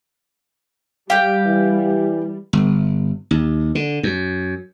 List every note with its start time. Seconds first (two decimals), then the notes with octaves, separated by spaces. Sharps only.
1.10 G3 G4 F5 G5
1.46 E3
2.53 G1
3.31 D#2
3.75 D3
4.03 F#2